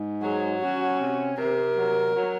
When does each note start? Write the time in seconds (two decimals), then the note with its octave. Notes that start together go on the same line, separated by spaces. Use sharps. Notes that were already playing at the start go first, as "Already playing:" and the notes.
Already playing: G#2
0.22 F#3 G#4
0.61 C#4 F#4
1.00 C3
1.37 C3 A#4
1.77 F#3
2.15 F#3